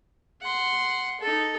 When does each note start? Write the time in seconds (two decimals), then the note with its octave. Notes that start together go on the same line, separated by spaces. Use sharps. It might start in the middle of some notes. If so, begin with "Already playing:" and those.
0.42 F#5 C6
1.20 D#4 A4